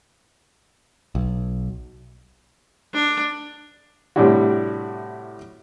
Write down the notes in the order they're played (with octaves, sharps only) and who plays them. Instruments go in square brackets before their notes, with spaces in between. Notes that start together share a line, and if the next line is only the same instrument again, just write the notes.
[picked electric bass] B1
[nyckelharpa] D4
[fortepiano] A2 C3 G3 D4 E4 F#4